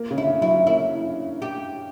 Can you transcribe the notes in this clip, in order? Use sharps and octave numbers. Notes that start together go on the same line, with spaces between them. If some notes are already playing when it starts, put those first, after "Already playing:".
Already playing: A#3
C#3
D3 E4
F#3 E4
A#3 E4
G4